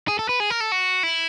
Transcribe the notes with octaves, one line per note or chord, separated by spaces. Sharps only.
G#4
A4
B4
G#4
A#4
A4
F#4
E4